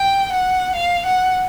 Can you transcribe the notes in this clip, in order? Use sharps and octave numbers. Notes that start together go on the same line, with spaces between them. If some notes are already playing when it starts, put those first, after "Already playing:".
Already playing: G5
F#5
F5
F#5